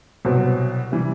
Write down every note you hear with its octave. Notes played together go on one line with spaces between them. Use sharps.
C2 B2 F#3 C4
C3 E3 G3